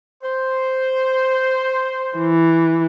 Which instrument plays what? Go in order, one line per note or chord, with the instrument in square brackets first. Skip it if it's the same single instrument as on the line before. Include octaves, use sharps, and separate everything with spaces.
[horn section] C5
[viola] E3